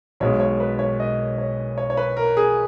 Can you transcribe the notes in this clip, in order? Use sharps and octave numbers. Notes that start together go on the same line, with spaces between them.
B1 B2 G#3 C#5
C#5
B4
C#5
D#5
C#5
C#5
C#5
B4
A#4
G#4